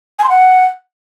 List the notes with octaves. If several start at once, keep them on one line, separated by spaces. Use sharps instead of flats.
G#5
C6
F#5